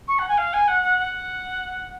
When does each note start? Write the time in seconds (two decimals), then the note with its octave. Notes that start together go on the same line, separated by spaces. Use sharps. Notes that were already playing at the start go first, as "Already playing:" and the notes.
0.08 C#6
0.18 F#5
0.28 G#5
0.37 F5
0.53 G#5
0.67 F#5
0.82 F#5
0.97 F#5